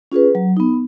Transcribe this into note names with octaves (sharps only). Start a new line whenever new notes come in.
C#4 F4 G#4 B4
F#3
B3 D#4